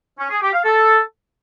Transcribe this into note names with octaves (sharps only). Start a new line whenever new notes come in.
C#4
G#4
G4
F5
A4